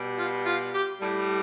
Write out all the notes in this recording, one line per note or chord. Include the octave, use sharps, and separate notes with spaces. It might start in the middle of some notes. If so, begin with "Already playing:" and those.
Already playing: B2 G3
F4
F4
G4
A2 G3